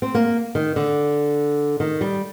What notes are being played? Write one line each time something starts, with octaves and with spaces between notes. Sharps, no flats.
C4
A#3
D#3
D3
D#3
G3